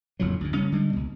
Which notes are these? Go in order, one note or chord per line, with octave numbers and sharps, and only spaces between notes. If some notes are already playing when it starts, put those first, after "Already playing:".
F#1 F2 A2 F#3
D2 G#2
F#1 C#3 G3 C#4
D3 G3 G#3
C#2 B2